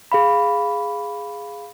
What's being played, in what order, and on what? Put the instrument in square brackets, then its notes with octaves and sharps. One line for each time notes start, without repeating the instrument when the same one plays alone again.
[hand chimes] G#4 F5 B5